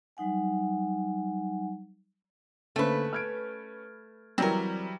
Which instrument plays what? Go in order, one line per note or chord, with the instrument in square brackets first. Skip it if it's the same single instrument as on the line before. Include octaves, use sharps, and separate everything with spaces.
[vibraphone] F#3 G3 D#4 F#5 G#5
[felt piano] D3 A#3 C5 [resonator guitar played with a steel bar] A3 B4 [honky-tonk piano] C#4
[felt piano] F6 G#6 D7
[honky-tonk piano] E3 F#3 G3 [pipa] C4 A#4